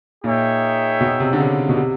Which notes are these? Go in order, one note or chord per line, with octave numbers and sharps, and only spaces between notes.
A#2 D#4 G#4 C#5 E5 G5
B2
C3
D3
C#3
B2
C3